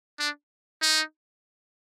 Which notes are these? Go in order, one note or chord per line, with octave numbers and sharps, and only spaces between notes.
D4
D#4